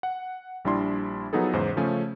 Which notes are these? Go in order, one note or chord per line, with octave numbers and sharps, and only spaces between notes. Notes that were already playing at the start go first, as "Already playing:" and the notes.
F#5
A#1 G3 D4 E4 C6
F3 F#3 B3 D#4 G#4 A4
E2 G#2 C#3 C5
C#3 F3 A3 C#4